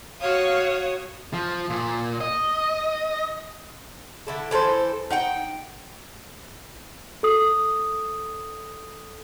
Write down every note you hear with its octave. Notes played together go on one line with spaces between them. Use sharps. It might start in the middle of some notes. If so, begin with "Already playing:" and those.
F#4 C#5 F5 D#6
F3
A#2
D#5
D3 E4 A4
E3 A4 A#4 C5
D#4 F#5 G5
A4 D#6